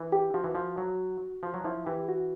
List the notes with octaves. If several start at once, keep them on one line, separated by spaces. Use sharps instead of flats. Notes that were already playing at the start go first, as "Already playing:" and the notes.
Already playing: E3
G4
F3 F#4
E3
F3
F#3
F3
F#3
F3 E4
E3 G4
F#4